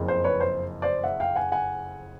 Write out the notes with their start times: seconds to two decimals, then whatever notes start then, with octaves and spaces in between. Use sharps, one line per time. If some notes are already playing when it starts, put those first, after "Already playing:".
Already playing: F#1 F2 C#3
0.08 C5
0.24 B4 C#5
0.40 C5
0.82 C5 D5
1.04 E5 F#5
1.20 F5 G5
1.35 F#5 G#5
1.52 F#5 G#5